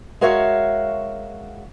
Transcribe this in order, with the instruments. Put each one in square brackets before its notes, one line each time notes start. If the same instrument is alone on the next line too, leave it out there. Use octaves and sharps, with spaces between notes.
[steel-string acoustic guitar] G#3 F#4 A#4 C#5 E5 F5